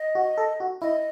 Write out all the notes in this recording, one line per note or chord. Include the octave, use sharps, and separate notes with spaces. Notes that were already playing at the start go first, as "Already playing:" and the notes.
Already playing: D#5
F#4
A4
F#4
E4 D#5